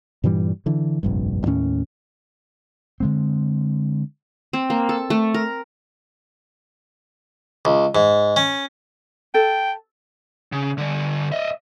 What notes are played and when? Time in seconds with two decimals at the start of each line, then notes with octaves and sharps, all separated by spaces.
0.24 G2 A#2 E3 G3
0.66 D3 E3
1.03 F1 A#1 G2
1.46 D#2 A2 C#4
3.00 D3 G#3 C4
4.53 C4
4.70 A#3
4.89 A4
5.10 A3
5.34 A#4
7.65 C#2
7.95 G#2
8.36 C#4
9.34 A4 G5
10.52 C#3
10.78 D3 G3
11.32 D#5 E5